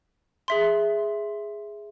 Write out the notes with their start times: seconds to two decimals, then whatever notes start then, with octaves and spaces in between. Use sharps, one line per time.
0.48 G#4 E5 C6